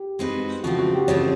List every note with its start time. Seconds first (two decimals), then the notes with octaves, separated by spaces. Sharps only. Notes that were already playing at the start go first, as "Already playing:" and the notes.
Already playing: G4
0.19 G#3 C4 D#4 F#4 B4
0.64 C#3 F3 A3 C4 F#4
0.79 F#4
0.93 G4
1.08 C#3 F3 A3 C4 C#5